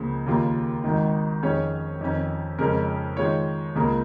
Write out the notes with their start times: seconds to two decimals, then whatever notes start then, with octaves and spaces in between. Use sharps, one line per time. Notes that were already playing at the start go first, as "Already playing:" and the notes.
Already playing: C#2 C#3 F3 A#3
0.26 D#2 C#3 A#3 F4
0.84 G#1 G#2 D#3
1.43 F2 D#3 C#4 G#4 C#5
2.01 F2 D#3 C#4
2.58 F2 C#3 G#3 C#4 A#4
3.17 D#3 G#3 F4 C#5
3.76 C#2 C#3 A#3 F4 A#4